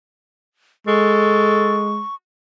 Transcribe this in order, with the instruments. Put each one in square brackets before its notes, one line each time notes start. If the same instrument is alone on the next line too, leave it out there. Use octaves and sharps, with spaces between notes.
[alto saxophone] G#3 [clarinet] A4 [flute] C#6